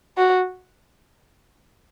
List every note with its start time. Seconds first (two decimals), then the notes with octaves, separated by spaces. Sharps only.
0.18 F#4